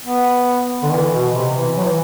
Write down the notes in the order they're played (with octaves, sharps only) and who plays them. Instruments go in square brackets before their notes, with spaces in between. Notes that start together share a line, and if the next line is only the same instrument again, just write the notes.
[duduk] B3
D3
E3
B2
C3
E3
F#3
E3